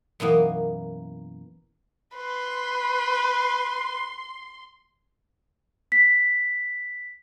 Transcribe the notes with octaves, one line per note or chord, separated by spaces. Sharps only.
F#2 B2 E3 A#3
B4 C6
B6